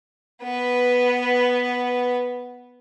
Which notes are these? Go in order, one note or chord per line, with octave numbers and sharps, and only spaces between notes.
B3 B4